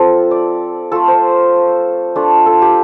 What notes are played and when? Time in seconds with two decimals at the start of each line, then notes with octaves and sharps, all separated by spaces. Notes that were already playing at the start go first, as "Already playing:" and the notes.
Already playing: F3 C4 F4 A4
0.31 D5
0.92 A3 F4 A4
1.08 C5
2.16 A3 D4 F4
2.46 A4
2.62 G4